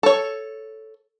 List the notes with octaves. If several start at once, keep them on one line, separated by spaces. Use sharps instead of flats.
A4 C#5